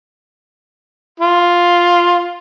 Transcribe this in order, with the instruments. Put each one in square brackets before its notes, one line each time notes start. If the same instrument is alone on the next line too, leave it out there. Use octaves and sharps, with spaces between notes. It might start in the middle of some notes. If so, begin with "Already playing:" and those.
[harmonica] F4